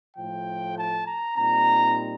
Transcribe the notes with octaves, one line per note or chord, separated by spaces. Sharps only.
A2 F3 A3 G5
A5
A#5
A#2 G3 C4 D#4 A#5